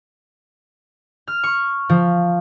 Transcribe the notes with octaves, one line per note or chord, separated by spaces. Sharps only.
F6
C#6
F3